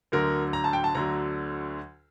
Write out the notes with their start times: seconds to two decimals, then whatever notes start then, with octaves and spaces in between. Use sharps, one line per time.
0.12 D2 D3 F#3 A#4
0.53 A#5
0.64 A5
0.73 G5
0.84 A5
0.95 D2 D3 F#3 A#5